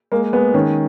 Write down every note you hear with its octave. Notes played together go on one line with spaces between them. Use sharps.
G#3 A#3
G#3 B3
D#3 C#4